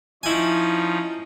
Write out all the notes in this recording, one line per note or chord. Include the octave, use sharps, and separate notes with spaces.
F3 C#4 D#4 E4 G#5